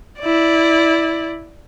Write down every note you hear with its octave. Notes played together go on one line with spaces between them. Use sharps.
E4 D5